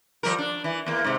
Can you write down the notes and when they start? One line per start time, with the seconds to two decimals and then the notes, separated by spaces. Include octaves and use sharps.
0.23 F3 G3 A#4
0.38 D4
0.64 E3
0.86 E2 A#3
1.04 G#2 C3